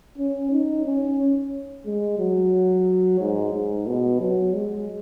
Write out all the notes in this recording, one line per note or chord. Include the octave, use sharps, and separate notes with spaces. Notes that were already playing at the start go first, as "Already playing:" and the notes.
C#4
D#4
C#4
G#3
F#3
G#2
G#2
B2
F#3
G#3